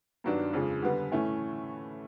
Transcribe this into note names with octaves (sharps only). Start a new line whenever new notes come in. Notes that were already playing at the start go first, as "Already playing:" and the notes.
G2 D#3 F#3 B3 D4
F2 C#3 F3 G#3
D3 G3 B3
A2 E3 A3 C#4